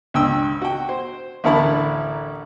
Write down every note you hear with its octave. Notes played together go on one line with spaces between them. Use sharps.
C#2 G2 G5 E6
F#4 G5
C5
A1 D2 E4 A#4 A5 B5